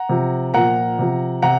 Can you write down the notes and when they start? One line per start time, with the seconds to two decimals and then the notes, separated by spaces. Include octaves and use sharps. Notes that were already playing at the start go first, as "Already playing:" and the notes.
Already playing: F#5 A#5
0.09 C3 F3
0.54 A#2 F3 F#5 A#5
0.99 C3 F3
1.42 C3 F#5 A#5